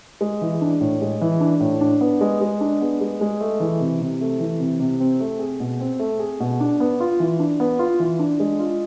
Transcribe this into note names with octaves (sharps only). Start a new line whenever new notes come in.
G#3
E3
D4
A2
G#3
E3
D4
A2
D4
B3
G#3
G#3
D4
B3
G#3
G#3
A3
E3
C3
C3
A3
E3
C3
C3
C4
A3
G#4
B2
C4
A3
G#4
B2
D4
B3
F4
E3
D4
B3
F4
E3
D4
G#3
F4